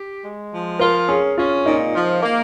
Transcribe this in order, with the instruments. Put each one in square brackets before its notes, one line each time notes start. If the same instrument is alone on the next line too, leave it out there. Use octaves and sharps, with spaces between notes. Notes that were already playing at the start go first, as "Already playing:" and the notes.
Already playing: [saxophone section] G4
G#3
F3
[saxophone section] F4 [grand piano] A#4
[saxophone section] C#4 [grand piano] G#4
[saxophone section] C#4 [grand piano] F4
[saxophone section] A#2 [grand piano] D#4
[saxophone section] F3
A#3